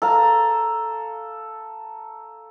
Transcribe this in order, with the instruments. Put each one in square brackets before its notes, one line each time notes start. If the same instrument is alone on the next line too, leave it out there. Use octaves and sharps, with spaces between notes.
[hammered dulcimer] A4 F5 A#5